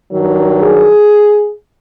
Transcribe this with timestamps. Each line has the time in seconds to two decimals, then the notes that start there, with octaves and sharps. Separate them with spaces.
0.12 G2 D#3 F#3
0.62 G#4